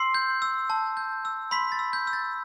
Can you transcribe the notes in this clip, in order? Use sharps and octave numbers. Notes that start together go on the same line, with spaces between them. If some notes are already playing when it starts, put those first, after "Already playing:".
Already playing: C6 E6 C7
G6
E6
A5
G6
E6
B5 C6 B6
A6
E6
G6
E6
A6